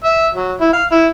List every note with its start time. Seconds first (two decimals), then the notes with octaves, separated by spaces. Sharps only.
0.04 E5
0.34 F#3
0.61 E4
0.73 F5
0.92 E4